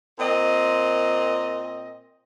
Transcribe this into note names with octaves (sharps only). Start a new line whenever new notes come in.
A#2 C4 D#5